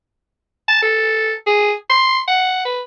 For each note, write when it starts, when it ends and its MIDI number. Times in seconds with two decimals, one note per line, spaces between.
0.68 0.82 81
0.82 1.33 69
1.46 1.73 68
1.90 2.20 84
2.28 2.60 78
2.65 2.81 71